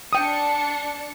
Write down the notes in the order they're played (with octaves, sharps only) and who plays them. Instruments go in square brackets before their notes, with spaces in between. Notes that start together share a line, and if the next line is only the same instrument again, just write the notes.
[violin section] D4 C#7 [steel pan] G5 D#6